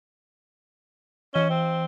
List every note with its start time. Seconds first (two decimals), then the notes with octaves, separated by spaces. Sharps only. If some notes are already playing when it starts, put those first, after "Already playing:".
1.34 E3 C#4 D#5 G7
1.50 C4